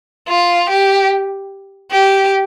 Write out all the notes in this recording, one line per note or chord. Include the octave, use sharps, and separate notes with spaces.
F4
G4
G4